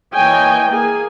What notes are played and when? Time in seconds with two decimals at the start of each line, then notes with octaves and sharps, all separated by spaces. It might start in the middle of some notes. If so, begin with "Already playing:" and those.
0.13 E3 A#3 C#5 D#5 G5 G#5
0.68 A#3 G#4 G#5